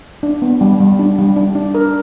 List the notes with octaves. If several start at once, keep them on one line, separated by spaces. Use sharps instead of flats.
D4
B3
G3
G3
D4
G3
D4
D4
A#4